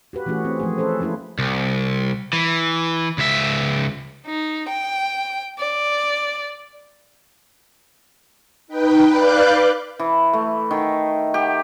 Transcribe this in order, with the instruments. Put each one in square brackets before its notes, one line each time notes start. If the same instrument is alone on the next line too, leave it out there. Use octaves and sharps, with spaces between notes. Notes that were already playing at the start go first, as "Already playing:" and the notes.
[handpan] F#4 G4 B4
E3 A3 C#4 F#4 G#4
C4
F3 A3 G#4
C#4 A4 B4 C5
F3 A#3 C#4 E4 A4
[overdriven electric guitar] C2
E3
C#2 E5
[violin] D#4
G5
D5
[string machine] D#4 B4 G5
B4 D5 F5 D6 F#6 G6
[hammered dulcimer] E3
A3
D#3
G4